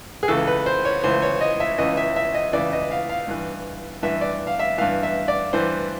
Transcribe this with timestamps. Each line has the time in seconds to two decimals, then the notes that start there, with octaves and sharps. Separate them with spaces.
0.23 G#4
0.28 C#2 C#3 E3 A4
0.47 B4
0.66 C5
0.85 C#5
1.04 C#2 C#3 E3 C5
1.22 C#5
1.41 D#5
1.60 E5
1.78 C#2 C#3 E3 D#5
1.97 E5
2.16 E5
2.34 D#5
2.53 C#2 C#3 E3 D5
2.73 D#5
2.91 F5
3.09 F5
3.28 G2 E3
4.03 G2 E3 E5
4.21 D5
4.47 F5
4.59 E5
4.78 G2 E3 F5
5.03 E5
5.28 D5
5.53 G2 E3 C5